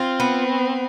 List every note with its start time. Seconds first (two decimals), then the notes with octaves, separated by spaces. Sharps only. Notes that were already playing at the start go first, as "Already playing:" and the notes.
Already playing: C4 F4
0.20 B3